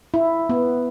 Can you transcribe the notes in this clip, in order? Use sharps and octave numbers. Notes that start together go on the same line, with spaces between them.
E4
B3